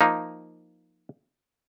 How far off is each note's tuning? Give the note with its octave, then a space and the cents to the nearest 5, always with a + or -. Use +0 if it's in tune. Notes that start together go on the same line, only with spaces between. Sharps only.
F3 +0 A#3 +0 D#4 +0